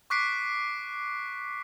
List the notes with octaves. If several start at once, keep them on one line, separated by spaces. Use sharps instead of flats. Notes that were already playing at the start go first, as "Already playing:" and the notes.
C#6 D6 F#6 B6 C7 D7